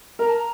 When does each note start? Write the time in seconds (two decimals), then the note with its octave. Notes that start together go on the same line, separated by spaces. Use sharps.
0.19 A#4 A#5
0.28 A5
0.37 A#5